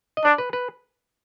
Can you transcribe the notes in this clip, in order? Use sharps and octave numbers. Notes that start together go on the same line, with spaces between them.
D#5
D4 D5
B4
B4